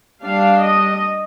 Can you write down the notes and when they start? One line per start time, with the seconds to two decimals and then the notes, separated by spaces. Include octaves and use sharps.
0.24 G3 D4 F5
0.61 D#5